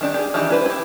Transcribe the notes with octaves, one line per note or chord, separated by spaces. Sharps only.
D#3 D4 G4
G4 G#4
D#3 E3 D4 G4
E4 B4 C5
E4 G4